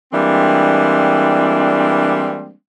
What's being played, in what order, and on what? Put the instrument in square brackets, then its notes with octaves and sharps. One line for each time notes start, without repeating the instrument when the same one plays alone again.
[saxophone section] E3 G3 G#3 A#3 C4 D4